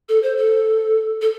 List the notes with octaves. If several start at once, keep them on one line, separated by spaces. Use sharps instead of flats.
A4
C5
A4
A4